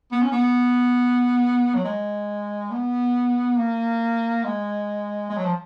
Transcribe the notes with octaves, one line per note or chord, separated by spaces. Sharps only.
B3
C#4
B3
F#3
G#3
B3
A#3
G#3
G#3
F#3
F3